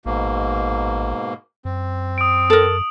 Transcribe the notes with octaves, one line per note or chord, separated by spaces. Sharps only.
A1 G#2 B2 A#3
F#2 C4
D#6 D7
A4 A#4 F#7